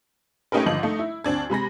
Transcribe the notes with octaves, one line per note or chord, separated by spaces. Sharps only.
A3 C#4 D#4 G4 A#4 B4
G#1 D3 F3 D#5 F#7
A3 D#4
E4
D2 C4 D4 G#6
C3 G#3 B5 A#6